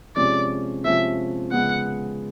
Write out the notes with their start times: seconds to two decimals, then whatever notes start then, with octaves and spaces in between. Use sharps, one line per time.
0.16 C3 F3 G#3 C#4 D5
0.85 C3 F3 G#3 C#4 E5
1.52 C#3 F3 G#3 B3 F#5